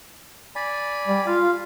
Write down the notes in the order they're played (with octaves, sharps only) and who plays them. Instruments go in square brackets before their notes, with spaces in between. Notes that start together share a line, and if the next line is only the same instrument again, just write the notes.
[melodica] D5 G#5 B5
[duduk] G3
[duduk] F4 [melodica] F5